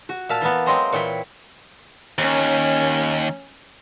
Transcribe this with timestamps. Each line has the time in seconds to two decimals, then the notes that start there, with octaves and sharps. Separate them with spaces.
0.09 F#4
0.29 A#2 E5 F5 A5
0.41 E3 A#3 B3
0.66 F#3 G#3 C4 G5 A#5 C6
0.93 A#2 E3 C#5 G5 B5
2.18 D#2 C#4